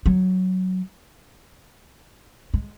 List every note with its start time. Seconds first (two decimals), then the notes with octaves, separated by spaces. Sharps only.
0.06 F#3
2.54 G#3